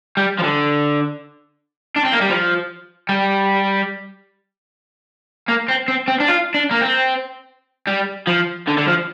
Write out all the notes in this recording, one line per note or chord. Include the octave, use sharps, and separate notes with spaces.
G3
F3
D3
D4
C4
A#3
G3
F3
G3
A#3
C4
C4
C4
D4
F4
D4
A#3
C4
G3
F3
D3
D3
F3